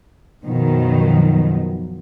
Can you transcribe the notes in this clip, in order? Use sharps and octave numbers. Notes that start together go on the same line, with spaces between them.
F#2 B2 D#3 F3